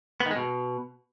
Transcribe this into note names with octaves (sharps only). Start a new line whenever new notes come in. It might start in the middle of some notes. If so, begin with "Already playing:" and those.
B3
D#3
G#3
B2